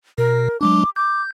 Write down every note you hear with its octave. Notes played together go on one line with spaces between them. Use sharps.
B2 A#4
F#3 G#3 D4 D6
D6 G6